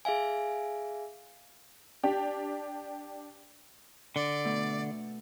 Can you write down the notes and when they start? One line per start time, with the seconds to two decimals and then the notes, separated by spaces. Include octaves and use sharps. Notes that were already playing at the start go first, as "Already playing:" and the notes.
0.05 G#4 E5 F5 G#5
2.03 D4 G4
4.16 D3 D5
4.44 B2 A3